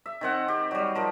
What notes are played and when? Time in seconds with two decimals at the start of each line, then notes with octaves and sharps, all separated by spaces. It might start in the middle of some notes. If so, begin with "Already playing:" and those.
0.06 E5
0.21 D#3 C4 F#5
0.48 G4
0.71 F#3 G3
0.95 F3 A#4